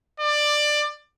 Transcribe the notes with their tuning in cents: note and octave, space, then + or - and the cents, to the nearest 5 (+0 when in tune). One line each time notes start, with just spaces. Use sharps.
D5 +15